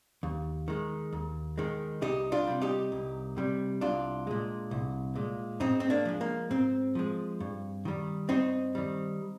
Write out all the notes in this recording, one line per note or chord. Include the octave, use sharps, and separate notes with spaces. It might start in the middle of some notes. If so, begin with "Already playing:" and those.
D#2
D#3 G#3
D#2
D#3 G#3
C2 D#4 G4
D4 F4
C3 G3
D#4 G4
C2
C3 G3
C2 D4 F4
A#2 G#3
C2
A#2 G#3
G#2 C4 D#4
C4
A#3 D4
F3 G#3
A#3
G#2 C4
F3 G#3
G2
D#3 G3
G2 C4 D#4
D#3 G3